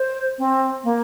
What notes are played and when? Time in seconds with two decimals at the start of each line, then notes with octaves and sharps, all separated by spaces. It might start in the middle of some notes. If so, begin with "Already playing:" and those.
Already playing: C5
0.38 C4
0.84 A#3